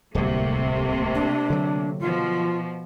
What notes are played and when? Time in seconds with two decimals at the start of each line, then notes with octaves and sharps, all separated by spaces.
0.15 D1 C2 C3 A3 A#3
1.15 D4
1.50 D3 F#3
2.00 B2 F3 F4